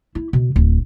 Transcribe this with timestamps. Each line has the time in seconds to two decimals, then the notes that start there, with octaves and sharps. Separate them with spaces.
0.15 E4
0.33 B2
0.56 D1